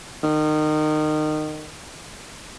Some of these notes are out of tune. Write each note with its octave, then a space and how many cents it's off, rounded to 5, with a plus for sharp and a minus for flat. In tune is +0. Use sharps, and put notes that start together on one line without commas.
D#3 -25